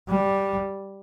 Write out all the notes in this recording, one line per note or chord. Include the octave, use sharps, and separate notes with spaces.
G3